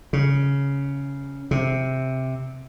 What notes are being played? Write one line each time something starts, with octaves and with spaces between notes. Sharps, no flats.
C#3
C3